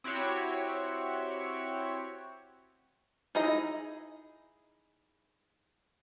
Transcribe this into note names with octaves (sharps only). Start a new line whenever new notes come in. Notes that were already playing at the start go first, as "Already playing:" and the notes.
C4 E4 F#4 G4 C#5
D#4 E4 G#4 D#5